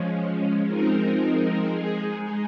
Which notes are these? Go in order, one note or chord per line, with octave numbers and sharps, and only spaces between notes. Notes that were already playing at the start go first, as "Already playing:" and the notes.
Already playing: F3 G#3 C#4
F3 G#3 C4 D#4 A#4
G#3 D#4 G#4